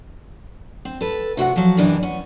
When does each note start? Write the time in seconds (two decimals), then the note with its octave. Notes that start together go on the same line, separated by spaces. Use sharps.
0.85 C4
1.01 A4 B4
1.37 C3 F#4 E5 F#5
1.56 F3 F#3
1.77 F#2 C3 E3 D4 D#4
2.03 B3 C#4